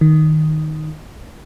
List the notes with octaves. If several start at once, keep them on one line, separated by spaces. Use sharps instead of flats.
D#3